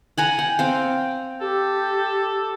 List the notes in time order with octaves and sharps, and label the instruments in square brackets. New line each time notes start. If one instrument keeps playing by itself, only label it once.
[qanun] F#5 G#5 A#5
[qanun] F#5 [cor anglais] G5
[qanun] C4 F5
[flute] G4 [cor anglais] A4